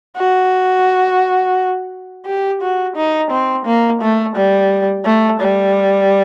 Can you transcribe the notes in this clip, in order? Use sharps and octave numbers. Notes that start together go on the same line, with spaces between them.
F#4
G4
F#4
D#4
C4
A#3
A3
G3
A3
G3